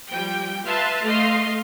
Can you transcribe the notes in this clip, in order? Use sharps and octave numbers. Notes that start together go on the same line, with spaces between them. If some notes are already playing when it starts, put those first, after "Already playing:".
F3 G3 G5
B4 E5 F5 A5 C6
A3 D#5 F5 C6